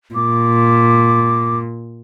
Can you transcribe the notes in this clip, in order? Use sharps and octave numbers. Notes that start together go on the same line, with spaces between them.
A#2 D6